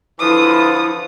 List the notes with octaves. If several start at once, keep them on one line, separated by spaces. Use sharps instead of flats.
D3 E3 F3 E4 D#6